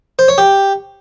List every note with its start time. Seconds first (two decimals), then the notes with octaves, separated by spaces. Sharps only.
0.19 C5
0.28 C#5
0.38 G4